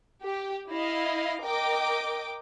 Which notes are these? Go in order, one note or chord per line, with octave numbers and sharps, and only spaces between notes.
G4
E4 D#5 F5
A#4 D#5 G5 D6